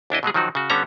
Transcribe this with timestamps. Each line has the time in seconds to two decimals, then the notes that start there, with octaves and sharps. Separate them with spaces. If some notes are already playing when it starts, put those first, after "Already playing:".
0.10 D#2 D4 E4 D#5
0.23 B2 F#3 G#3 G#4
0.34 D#3 F3 F#3 D#4 F#4
0.55 C#3 F#4
0.70 D3 G3 B3 C#4 A4 A#5